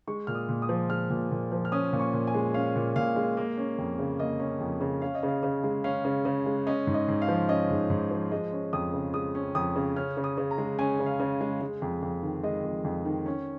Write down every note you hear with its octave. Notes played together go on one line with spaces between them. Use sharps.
G#3 C#6
A#2 F6
D#6
A#2
D#6
F3
G#3 F6
A#2
A#2
F3
F6
C#4 D#6
A#2
C#6
A#2
G#5
G#3
C#4 F5
A#2
A#2 F5
G#3
A#3
C#4
F2
C#3
A#3 D#5
C#4
F2
C#3
C#4 F5
D#5
C#3
F5
C#3
G#3
C#4 F5
C#3
C#3
G#3
C#4 D#5
G#2
D#5
G#2
F5
F3
C#4 D#5
G#2
G#2
F3
G#3 D#5
C#4
F2 D#6
C#3
G#3 D#6
C#4
F2 D#6
C#3
C#4 F6
C#3
D#6
C#3
A#5
G#3
C#4 G#5
C#3
F5
C#3
G#3
G#3
F2
F2
D#3
G#3 D#5
F2
F2
D#3
C#4